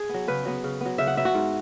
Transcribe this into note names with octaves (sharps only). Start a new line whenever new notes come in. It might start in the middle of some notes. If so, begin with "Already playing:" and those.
Already playing: G#4
F#3 B3
C#3 B4
F#3 B3
C#3
F#3 B3
C#3 E5
F#5
F#3 B3 E5
F#4
G#2